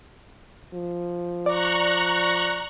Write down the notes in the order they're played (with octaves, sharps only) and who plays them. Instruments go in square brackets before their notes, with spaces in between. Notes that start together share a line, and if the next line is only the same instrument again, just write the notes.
[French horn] F3
[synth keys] D5 [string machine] A#5 C#6 F#6